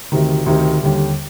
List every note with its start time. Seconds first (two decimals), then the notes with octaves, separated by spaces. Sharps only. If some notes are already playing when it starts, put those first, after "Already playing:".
0.12 D2 C3 D#3
0.46 D2 C3 D#3
0.80 D#2 D3 G3